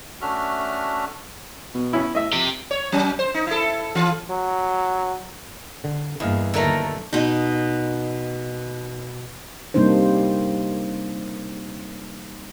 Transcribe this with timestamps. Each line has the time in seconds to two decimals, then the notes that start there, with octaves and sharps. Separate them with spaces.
0.21 A3 C#4 D4 F#4 E5 F6
1.74 B2
1.93 B3 C#4 E4
2.15 A2 D#5 E5
2.33 F2 C3 G4
2.71 C#5
2.92 F#3 C#4
3.19 C5
3.34 D#4
3.47 E4 A4
3.95 E3 F4
4.30 F#3
5.84 D3
6.20 E2 G2 A#3 E4 D#5 F5
6.54 D#2 D3 D#3 F#3 A3 A#4
7.13 B2 D#4
9.74 C3 G3 A#3 D4 D#4 C5